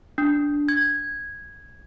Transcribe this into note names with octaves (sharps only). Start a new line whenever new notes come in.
D4
G#6